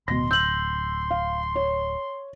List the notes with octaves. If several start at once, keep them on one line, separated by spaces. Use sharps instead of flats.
D1 B2 C6 A#6
E6 G6 F#7
F5
C#5